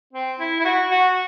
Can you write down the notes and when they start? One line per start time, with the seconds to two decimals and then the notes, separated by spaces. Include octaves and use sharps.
0.13 C4
0.40 E4
0.60 E4
0.65 F#4
0.91 F#4